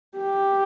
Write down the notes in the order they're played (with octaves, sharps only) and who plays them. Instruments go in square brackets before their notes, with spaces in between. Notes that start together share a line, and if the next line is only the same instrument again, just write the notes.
[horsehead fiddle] G4